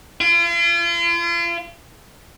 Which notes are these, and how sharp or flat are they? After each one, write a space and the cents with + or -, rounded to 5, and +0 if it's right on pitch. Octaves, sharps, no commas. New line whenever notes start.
F4 -40